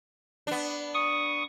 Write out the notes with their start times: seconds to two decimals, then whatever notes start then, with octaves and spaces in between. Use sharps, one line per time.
0.47 B3 D4
0.94 C#6 D#6